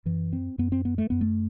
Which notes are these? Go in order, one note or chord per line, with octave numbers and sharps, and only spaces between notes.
F#2 E3
C4
F#2 B3
C4
B3
A3
F#2 B3
A3